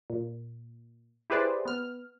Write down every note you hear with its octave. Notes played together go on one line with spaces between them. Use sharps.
A#2
E4 G4 G#4 B4 C5 D5
B3 F6